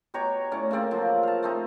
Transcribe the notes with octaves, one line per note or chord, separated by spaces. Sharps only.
B2 G4 C#5 A#5
A2 C#4 D5
C#3 A#3 C4 D5
F3 F#3
F5 A5
A3 C4 D#4